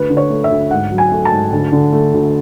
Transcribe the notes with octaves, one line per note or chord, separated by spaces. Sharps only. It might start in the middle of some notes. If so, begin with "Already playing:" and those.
Already playing: D2 B4
D3
C#5
A3
E5
D2
G#2 F#5
F#3
G#5
A3
A5
G#2
D2
D3
A3
D2